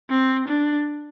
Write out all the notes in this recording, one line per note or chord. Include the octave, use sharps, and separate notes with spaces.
C4
D4